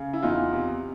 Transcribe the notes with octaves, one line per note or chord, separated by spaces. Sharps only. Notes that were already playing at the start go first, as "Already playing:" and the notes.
Already playing: C#3
E4
E2 D#4 F4
C3